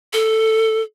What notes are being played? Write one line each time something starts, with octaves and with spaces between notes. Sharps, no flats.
A4